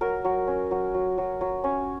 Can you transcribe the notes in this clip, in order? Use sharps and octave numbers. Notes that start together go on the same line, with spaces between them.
F#3 A#4
F#3
C#4
F#3
F#3
F#3
F#3
C#4